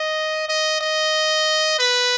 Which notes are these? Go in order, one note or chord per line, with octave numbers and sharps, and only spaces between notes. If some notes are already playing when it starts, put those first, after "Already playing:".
Already playing: D#5
D#5
D#5
B4